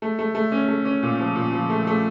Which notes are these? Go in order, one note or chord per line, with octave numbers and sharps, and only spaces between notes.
A3
A3
A3
C#4
A3
C#4
A#2
F3
A#2
F3
A3
A3